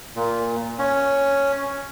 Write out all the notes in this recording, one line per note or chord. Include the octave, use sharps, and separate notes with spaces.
A#2
C#4